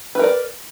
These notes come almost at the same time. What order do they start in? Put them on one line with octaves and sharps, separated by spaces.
B4 A#4 D5